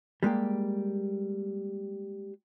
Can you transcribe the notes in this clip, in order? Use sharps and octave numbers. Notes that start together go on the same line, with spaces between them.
G3 G#3 A#3 G4